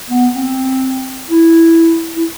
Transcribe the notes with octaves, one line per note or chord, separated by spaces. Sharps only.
B3
C4
E4
E4